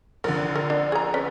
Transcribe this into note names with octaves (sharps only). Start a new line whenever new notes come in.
A#1 D3 A#4
A#4
D4
G#4 A#5
C#4 B4